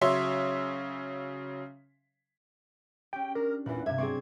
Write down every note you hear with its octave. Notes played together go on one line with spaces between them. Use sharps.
C#3 F#3 C#5 E5 C6
C#4 G4 G5
D4 A#4
E2 A#2 E3 F#6
G2 C3 E5 G#6
F#3 C4 G#4 D5 C#6